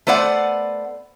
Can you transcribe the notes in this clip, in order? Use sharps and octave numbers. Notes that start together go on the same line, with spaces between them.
A3 B3 C5 D5 F5 F#5